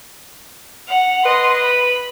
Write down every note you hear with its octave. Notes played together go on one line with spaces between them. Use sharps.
F#5 F7
B4 D#5 C6
B5